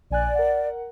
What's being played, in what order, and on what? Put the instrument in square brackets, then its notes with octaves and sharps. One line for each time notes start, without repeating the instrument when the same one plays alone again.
[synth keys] A#1 G#5 F#6 [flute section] D5
[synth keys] A#4 F#5